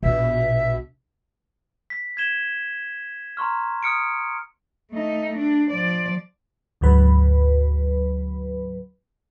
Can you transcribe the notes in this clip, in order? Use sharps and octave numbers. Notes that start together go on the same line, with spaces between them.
A#1 B2 E5
B6
G#6 B6 E7 G7
A#5 C6 C#6 F6
D#6 F6 C#7 D7
A3 D#4
D4
F3 D5
D2 G#2 F#3 B4